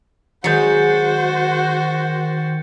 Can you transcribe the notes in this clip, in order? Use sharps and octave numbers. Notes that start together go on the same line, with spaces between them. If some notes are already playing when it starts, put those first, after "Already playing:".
D#3 F#3 G#3 F#4 C5 G6 A6 C#7